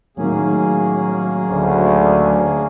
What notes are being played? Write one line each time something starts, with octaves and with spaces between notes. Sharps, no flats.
A2 D#3 F#3 A#3 C#4 G#4
D2